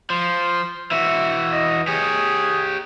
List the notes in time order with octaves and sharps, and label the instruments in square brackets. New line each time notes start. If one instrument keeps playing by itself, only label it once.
[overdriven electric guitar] F3 [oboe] C6
[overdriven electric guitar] E3 F#4 [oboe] E5
[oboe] D#5
[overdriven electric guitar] G4 C#5 [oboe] G#4